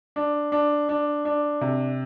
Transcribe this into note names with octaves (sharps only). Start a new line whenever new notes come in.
D4
D4
D4
D4
C3